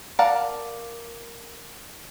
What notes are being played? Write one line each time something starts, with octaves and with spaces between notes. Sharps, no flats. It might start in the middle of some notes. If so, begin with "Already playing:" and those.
A#4 D5 F5 F#5 A5